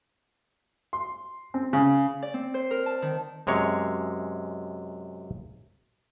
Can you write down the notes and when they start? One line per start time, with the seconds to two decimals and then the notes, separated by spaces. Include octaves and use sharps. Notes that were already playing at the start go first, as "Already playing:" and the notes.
0.93 C6
1.54 C4
1.73 C#3
2.22 D5
2.34 C4
2.54 C5
2.71 A#4
2.86 A5
3.02 D#3
3.47 F#2 C3 G#3 C#5